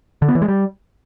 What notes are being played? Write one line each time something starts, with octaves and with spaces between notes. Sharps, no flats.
D3
B3
E3
G#3
G3